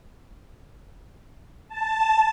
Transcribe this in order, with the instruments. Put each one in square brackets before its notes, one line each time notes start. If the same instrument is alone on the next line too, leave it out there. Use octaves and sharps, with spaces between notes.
[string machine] A5